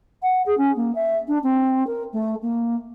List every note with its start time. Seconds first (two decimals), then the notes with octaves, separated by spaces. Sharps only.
0.22 F#5
0.46 G#4
0.57 C#4
0.76 A#3
0.95 E5
1.27 D4
1.43 C4
1.86 A#4
2.12 A3
2.42 A#3